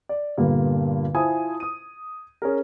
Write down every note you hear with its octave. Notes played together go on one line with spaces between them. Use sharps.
D5
G2 A#2 D3 G3 A#3 B3
E4 F4 C5 G#5 A5 D#6
D#6 D#7
C#4 G#4 A#4